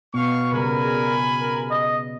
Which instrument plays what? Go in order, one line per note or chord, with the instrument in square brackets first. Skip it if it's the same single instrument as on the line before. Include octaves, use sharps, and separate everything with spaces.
[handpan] B2 B3 [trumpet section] F5 C#6
[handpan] C#3 G3 [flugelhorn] A#4 [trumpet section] G#5 B5
[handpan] G#4
[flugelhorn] A#4
D#5